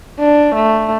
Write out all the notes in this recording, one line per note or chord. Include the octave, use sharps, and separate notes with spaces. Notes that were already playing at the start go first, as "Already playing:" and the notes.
D4
A3